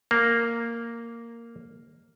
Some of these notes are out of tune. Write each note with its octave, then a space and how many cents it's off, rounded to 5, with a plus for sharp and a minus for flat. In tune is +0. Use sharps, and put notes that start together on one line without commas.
A#3 -5